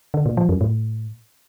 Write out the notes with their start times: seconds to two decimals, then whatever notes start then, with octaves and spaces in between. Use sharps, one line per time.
0.14 D3
0.26 A#2
0.37 F3
0.49 F#2
0.61 A2